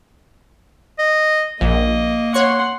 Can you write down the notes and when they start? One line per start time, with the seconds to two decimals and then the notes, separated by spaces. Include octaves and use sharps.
0.99 D#5
1.61 A#1 A#3 D#5
2.34 C#5 F#5 C6 C#6